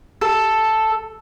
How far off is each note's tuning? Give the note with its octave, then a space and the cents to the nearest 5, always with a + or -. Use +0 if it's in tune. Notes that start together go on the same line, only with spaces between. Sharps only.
A4 +0